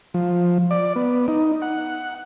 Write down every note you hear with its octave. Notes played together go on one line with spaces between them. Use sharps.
F3
D5
B3
D#4
F#5